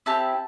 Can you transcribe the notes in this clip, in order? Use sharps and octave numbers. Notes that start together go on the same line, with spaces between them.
C4 E4 G4 A5